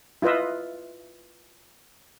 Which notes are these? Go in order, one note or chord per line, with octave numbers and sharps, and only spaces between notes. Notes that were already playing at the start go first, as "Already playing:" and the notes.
E4 F4 B4 D#5 E5